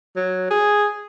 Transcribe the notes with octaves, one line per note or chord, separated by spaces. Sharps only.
F#3
G#4